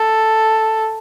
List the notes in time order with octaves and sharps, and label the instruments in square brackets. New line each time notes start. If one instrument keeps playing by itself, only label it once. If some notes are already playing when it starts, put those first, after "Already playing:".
Already playing: [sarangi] A4